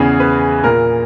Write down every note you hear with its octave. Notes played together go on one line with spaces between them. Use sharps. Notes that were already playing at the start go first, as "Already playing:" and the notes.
Already playing: E2 C#3 E3 G#4
B4
A#2 A#4